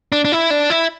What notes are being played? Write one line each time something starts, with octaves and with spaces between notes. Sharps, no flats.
D4
D4
E4
D4
E4